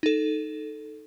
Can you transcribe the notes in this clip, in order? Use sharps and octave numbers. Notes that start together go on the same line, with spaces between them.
D#4 A4